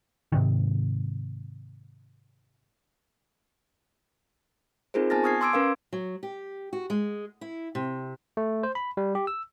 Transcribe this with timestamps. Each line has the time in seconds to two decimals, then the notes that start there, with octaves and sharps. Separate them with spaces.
0.32 G#2 C3 D#3
4.94 C4 D#4 F4 G#4 A#4 C5
5.10 B3 G#5 A5 F6 A6 A#6
5.24 C#6 D#6 F6 G#6 C7
5.41 C6 D6 E6 G#6 D7
5.53 C#4 A#4 B4 F5
5.93 F#3
6.23 G4
6.73 F#4
6.90 G#3
7.41 E4
7.75 C3
8.37 A3
8.63 C5
8.75 B5
8.97 G3
9.15 G4
9.27 E6